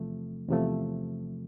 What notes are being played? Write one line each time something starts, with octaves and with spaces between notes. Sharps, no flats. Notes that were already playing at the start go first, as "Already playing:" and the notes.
Already playing: E2 C3 F3 A3
E2 C3 F3 A3